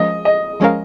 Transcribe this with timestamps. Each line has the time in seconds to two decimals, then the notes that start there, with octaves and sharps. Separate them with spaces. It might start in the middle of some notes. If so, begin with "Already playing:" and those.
Already playing: F3 G#3 C#4 A#4 D#5
0.25 D#5
0.60 F3 G#3 C#4 A#4 F5